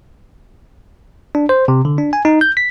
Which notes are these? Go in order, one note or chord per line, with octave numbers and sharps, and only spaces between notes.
D4
C5
C3
D3
D4
G#5
D#4
G6
B6